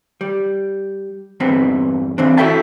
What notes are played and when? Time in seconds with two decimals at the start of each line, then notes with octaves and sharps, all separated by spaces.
0.21 G3
1.40 E2 G2 B3 C4
2.18 E3 C4 D4
2.37 E4 F#4 A4 E5 G5 A5